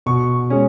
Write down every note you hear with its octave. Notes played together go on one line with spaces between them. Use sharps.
B2 C#6
G#3 C#4